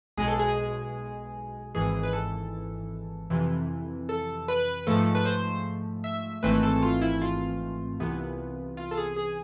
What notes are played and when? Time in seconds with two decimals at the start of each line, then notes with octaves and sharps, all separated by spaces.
0.17 B1 B2 G#3 G#4
0.28 A4
0.39 G#4
1.75 G#1 G#2 E3 G#4
2.03 B4
2.13 A4
3.30 F2 C3 E3
4.09 A4
4.48 B4
4.87 G#2 F3 A3 A4
5.15 B4
5.25 C5
6.04 E5
6.43 G#1 G#2 E3 A3 C4 B4
6.63 A4
6.82 F4
7.01 E4
7.22 F4
8.00 C2 C3 E3 B3
8.77 F4
8.91 A4
8.97 G#4
9.16 G#4